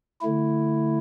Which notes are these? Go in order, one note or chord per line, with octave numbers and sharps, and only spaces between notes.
D3 A3 E4